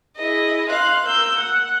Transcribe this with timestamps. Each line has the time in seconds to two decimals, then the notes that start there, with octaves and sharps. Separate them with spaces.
0.16 E4 G#4 D#5
0.68 F5 C6 F#6
1.06 A#3 E6 G6
1.37 F#5